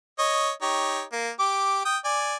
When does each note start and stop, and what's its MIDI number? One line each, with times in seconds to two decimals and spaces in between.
0.19 0.51 73
0.19 0.51 75
0.62 1.02 63
0.62 1.02 67
0.62 1.02 73
1.13 1.30 58
1.39 1.84 67
1.39 1.84 86
1.85 1.97 79
1.85 1.97 87
2.05 2.36 74
2.05 2.36 80